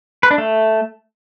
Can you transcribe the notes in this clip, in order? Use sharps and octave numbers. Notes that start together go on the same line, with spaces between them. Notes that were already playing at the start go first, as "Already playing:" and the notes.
B4
D4
A3